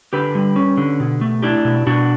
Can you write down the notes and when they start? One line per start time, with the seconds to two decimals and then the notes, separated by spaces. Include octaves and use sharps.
0.13 D3 G4 B4
0.35 G3
0.56 C#4
0.77 D3
1.00 B2
1.21 A3
1.42 D4 E4 G4
1.65 B2
1.87 B2 D4 F#4